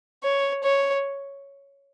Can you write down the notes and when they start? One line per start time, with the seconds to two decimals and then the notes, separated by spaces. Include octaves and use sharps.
0.24 C#5
0.64 C#5